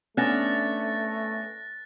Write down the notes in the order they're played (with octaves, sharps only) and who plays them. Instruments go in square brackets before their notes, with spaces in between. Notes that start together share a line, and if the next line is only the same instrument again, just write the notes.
[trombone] A3 [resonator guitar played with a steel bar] B3 C#4 D4 [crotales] F#6 A6 A#6